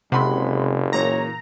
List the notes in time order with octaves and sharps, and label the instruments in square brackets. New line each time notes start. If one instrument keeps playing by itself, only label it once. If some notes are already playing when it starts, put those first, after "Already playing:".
[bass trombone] F#1 [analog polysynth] C3 [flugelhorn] G#3 [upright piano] F#5 B5 C6
[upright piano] A#2 E3 [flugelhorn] C#5 [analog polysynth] A#5